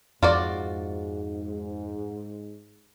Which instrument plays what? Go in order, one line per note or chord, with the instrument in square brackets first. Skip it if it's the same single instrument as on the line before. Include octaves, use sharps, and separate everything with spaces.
[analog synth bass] F2 [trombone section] G#2 [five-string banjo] F4 F#4 D5